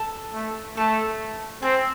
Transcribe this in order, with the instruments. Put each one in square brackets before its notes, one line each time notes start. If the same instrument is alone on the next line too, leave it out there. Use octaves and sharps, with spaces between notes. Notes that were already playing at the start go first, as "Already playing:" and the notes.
Already playing: [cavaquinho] A4
[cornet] A3
[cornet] A3 [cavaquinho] A4
[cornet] C4 [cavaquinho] G#4